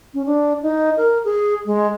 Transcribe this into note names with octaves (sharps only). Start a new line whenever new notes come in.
C#4
D4
D#4
A#4
G#4
G#3